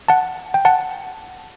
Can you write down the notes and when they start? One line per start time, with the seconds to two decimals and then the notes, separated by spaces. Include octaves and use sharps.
0.08 F#5 A5
0.54 G5
0.65 F#5 A5